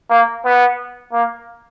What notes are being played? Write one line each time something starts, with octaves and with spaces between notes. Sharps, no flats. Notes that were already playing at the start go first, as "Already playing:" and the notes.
A#3
B3
A#3